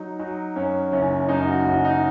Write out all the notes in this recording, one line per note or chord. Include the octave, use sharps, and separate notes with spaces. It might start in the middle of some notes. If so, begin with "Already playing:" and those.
Already playing: F#3 D#4
F#3 D#4
F#2 C#4
F#1 C#4
F#2 D#4
F#4
F#1 F#4
D#4